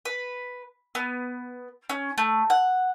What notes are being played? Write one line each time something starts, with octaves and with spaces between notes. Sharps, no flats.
B4
B3
C#4
A3
F#5